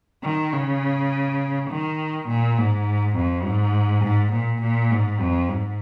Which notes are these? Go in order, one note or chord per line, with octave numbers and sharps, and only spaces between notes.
D#3
C#3
D#3
A#2
G#2
F2
G#2
G#2
A#2
A#2
G#2
F2
G#2